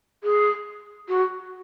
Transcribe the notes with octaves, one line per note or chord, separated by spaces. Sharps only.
G#4
F#4